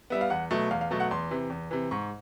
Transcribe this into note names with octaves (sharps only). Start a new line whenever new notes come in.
G3 B3 E5
F5
E2 F#5
B2 F#3 A3
E2 F5
F5
B2 F#3 A3
F#5
E2 C6
C3 E3
E2
C3 E3
G#2 C#6